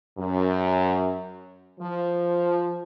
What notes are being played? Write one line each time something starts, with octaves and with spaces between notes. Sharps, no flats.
F#2
F3